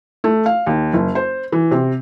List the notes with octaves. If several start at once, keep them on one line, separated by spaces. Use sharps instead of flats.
A3
F5
D#2
F#1
C5
E3
C3